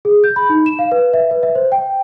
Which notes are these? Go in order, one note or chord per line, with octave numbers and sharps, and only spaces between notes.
G#4
G6
B5
D#4
E7
F5
B4
E5
B4
E5
C5
G5